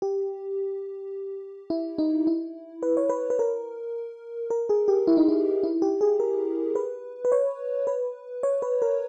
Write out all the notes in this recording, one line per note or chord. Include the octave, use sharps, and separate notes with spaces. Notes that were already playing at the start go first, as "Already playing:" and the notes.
G4
E4
D#4
E4
B4
C#5
B4
B4
A#4
A#4
G#4
G4
E4
D#4
E4
E4
G4
G#4
A#4
B4
B4
C#5
B4
C#5
B4
A#4